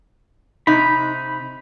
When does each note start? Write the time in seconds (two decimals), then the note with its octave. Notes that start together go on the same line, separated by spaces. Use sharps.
0.67 C3 D#4 B5